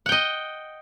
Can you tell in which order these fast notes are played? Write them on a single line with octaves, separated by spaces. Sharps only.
F#5 G5 D#5